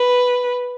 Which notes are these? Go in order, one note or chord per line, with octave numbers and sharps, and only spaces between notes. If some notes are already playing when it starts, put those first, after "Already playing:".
Already playing: B4